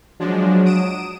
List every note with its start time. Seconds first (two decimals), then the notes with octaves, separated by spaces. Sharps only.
0.20 F3 F#3 G#3 D4
0.65 D#6 D7 E7